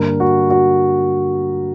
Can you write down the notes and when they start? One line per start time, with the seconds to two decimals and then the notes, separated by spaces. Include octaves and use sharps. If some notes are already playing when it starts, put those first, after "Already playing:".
Already playing: G2 D3 G3 A#3 D4 A#4
0.20 F#4
0.50 F#4